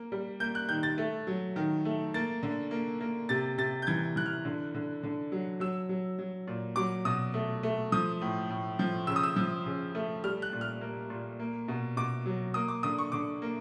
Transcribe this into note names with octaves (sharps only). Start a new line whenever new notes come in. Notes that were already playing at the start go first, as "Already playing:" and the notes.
Already playing: A#3
G3
A#3 G6
F#6
D#3 G6
A6
A3
F#3
D#3
A3
A#3 A6
D3
A#3
A#3
C3 A6
C3 A6
G6
E3 G#6
E3 F#6
F6
D3
D3
D3
F#3
F#3 E6
F#3
F#3
A#2
F#3 D6
B2 D#6
A3
A3
F3 D#6
A2
A2
F3
C#3 E6
D#6
E6
F3
C#3
A3
G3 F6
F#6
A#2
F6
A#3
A#2
A#3
B2
B2 D6
F#3
A#3 D#6
D6
D3 D#6
C#6
D3 D6
A#3